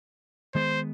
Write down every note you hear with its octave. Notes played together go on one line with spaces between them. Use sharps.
D#3 G#3 B3 C5